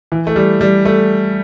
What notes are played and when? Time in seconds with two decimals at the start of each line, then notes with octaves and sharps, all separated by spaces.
0.12 E3
0.27 A3
0.36 G3
0.61 G3
0.85 A3